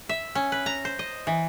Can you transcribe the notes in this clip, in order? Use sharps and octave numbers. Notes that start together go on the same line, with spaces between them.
E5
C#4
B4
A#5
C5
D#5
E3